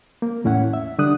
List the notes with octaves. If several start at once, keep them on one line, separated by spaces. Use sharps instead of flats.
A#3
E2 A2 C#4 E4 F#5
E5
D3 G3 D4 D#6 F#6